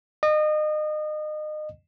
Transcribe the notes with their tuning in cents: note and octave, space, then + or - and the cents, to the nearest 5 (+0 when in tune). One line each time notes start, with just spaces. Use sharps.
D#5 -30